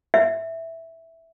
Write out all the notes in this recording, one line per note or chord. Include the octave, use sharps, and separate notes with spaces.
E5